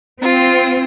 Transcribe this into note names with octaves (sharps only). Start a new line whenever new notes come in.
C4 F4